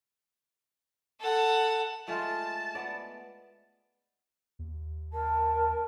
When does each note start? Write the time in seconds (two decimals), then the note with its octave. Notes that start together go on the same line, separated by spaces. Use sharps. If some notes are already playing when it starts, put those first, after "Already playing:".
1.20 A4 F#5
2.08 G#3 A3 F4 A5
2.75 B3 D5
4.59 D#2
5.13 A#4 A5